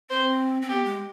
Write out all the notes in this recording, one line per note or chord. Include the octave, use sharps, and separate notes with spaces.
C4 C5
C4
B3 G4
G#3